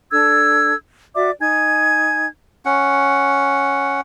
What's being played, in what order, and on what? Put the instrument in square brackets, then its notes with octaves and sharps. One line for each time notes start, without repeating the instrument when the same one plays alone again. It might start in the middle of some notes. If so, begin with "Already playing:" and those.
[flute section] D4 A4 E6 G#6
F#4 D5 E5 D6
D#4 G#5 G#6
[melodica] C#4 F#5